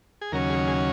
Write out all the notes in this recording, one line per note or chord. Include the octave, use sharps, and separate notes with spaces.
G#4
D#2 C#3 F#3 C#4 A#4
G#4
G#4